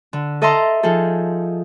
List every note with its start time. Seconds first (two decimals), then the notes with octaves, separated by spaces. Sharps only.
0.13 D3
0.42 A4 D#5 E5 A5 A#5 C6
0.83 F3 D#4 G#4 A4